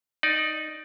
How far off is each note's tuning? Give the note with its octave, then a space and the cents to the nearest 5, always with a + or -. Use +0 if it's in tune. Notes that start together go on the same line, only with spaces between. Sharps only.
D#4 -5 D5 +10